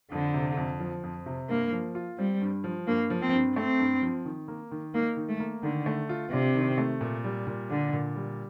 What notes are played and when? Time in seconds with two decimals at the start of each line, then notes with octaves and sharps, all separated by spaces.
0.12 F2 D3
0.34 C3
0.57 F2
0.80 F3
1.03 F2
1.26 C3
1.49 G2 A#3
1.72 F3
1.95 F4
2.18 G3 C4
2.41 G2
2.64 F3
2.87 G2 A#3
3.10 F3
3.22 C4
3.33 G2
3.56 A3 C4
3.79 G2
4.02 F3
4.25 D#3
4.48 A#3
4.71 D#3
4.94 A#3 D#4
5.17 D#3
5.29 A3
5.40 A#3
5.63 D3 D#3
5.86 A3
6.09 F4
6.32 C3 D4
6.55 D#3
6.78 A3
7.01 A#2
7.24 G3
7.47 A#2
7.70 D3 D4
7.93 A#2
8.16 G3